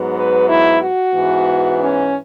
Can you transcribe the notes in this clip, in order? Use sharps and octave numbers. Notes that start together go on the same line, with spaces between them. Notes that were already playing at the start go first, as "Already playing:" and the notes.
Already playing: G#2 F#3 B3
B4
E4
F#4
G#2 E3 B3
C#4